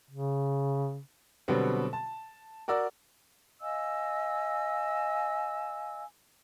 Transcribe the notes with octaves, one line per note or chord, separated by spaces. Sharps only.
C#3
B2 D3 F#3 G3 B3 C4
A5
F#4 A#4 D5 E6
D#5 F5 G#5 E6